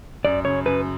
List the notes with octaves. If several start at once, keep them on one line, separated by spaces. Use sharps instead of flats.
F#2 D5
C#3 C#5
F#2 B4